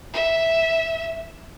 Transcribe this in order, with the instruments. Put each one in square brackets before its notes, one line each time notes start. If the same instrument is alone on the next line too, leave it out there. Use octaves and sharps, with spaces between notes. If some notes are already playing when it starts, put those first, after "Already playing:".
[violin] E5